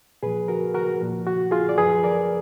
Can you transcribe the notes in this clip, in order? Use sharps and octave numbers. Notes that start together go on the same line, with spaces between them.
A#2 F3 G#4 B4
F#4 A#4
F#4 A#4
A#2 F3
F#4
F4 G#4
D5
F#2 F3 G#4 B4
A#4 D5